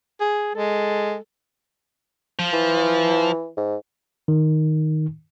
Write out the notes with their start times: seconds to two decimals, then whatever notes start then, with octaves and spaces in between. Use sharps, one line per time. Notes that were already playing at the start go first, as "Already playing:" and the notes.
0.21 G#4
0.55 G#3 A4
2.39 F3
2.53 E3
3.57 G#2
4.28 D#3